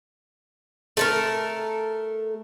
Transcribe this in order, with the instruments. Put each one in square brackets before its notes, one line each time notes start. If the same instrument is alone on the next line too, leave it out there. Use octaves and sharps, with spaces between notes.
[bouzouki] A3 A4 A#4